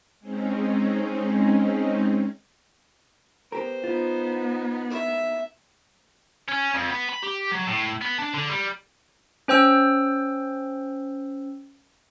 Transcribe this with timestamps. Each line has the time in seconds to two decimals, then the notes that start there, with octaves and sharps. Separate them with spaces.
0.20 G#3 C4 C#4 D#4
3.52 B3 G4 A#4 C5
3.84 B3 D#4 F4
4.90 E5
6.48 C#4
6.74 F2
6.90 B3
7.10 B5
7.24 G4
7.52 F#3
7.67 A2
8.01 B3
8.18 D4
8.34 D3
8.50 G3
9.48 C#4 C5 G5 E6